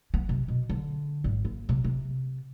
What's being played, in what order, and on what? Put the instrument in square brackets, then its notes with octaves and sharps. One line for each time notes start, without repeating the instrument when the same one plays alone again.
[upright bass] B3
C3
B2
D3
G#1
A#3
C3
C3